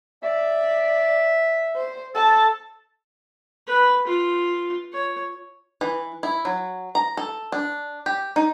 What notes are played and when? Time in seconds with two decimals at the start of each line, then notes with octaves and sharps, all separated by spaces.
0.23 D5 E5
1.76 C5
2.15 A4 A5
3.67 B4
4.07 F4
4.93 C#5
5.81 E3
6.23 E4
6.45 F#3
6.95 A#5
7.17 A4
7.52 D4
8.06 G4
8.36 D#4